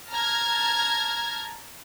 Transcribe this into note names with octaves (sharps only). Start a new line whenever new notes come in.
A5 A#5 F6 G#6